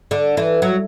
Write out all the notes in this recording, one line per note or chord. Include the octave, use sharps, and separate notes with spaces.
D3
E3
F#3